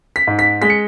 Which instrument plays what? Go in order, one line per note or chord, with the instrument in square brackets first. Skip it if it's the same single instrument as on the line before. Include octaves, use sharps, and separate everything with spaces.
[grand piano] B6
G#2
B6
G#3 B6
C#7